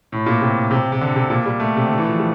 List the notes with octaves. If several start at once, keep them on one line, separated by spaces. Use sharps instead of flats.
A2
A#2
C3
C3
C3
D3
C3
A#2
G3
A3
C3
D3
E3
F3
G3